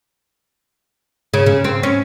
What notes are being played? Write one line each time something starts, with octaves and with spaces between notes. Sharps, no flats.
C#3
C#3
C4
C#4